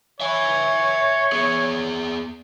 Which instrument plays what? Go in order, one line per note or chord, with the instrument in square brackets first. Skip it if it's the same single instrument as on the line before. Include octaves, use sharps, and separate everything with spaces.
[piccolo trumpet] C#5 [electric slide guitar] E5 G#5
[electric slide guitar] B3 G#4